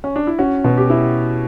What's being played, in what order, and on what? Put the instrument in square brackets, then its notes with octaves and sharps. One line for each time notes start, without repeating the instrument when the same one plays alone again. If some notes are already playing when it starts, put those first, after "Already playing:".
[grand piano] C#4
D4
E4
[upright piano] C#4 [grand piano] F#4
[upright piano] B2
[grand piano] G4
[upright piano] E4